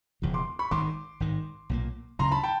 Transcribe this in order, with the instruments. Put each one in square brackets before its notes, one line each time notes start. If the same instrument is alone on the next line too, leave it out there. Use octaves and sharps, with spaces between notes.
[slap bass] E1 E2 C#3 F3
[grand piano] C6 D6
B5 C#6
[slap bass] G#1 G#2 D#3 [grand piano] C6 D6
[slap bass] G#1 G#2 D#3
B1 A#2 F3 A#3
[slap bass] D2 C#3 F#3 [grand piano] A#5 C6
[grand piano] A5 B5
G5 A5